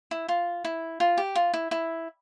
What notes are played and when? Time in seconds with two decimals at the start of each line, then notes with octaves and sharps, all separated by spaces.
0.11 E4
0.28 F4
0.64 E4
1.00 F4
1.17 G4
1.35 F4
1.54 E4
1.71 E4